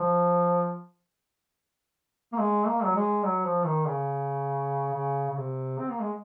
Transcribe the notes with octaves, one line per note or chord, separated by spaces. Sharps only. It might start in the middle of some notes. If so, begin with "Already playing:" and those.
Already playing: F3
A#3
G#3
A#3
F#3
G#3
F#3
F3
D#3
C#3
C#3
C#3
C3
C4
A#3
G#3